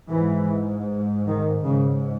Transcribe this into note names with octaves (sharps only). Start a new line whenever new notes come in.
G#2 E3
D#3
G#2 C#3